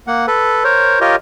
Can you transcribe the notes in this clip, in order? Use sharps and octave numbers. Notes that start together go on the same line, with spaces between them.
A#3 F#5
A4 B4
A#4 C5 C#5
F4 G4 A#4 C#5 D#5